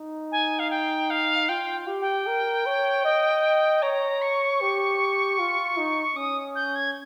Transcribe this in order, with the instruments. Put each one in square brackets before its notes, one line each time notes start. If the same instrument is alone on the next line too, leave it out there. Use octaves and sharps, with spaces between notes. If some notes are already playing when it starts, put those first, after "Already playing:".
Already playing: [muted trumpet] D#4
[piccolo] G#5
F5
G5
F5
[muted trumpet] F4 [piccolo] G5
[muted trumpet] G4
[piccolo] G5
[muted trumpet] A#4
C#5
D#5
[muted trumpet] C#5 [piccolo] A#5
[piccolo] C#6
[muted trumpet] G4
F4
D#4
[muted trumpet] C#4 [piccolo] D#6
[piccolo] G6
G#6